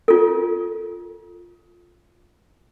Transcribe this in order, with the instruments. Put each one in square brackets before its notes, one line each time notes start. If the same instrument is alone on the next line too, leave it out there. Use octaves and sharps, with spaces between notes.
[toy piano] F4 A4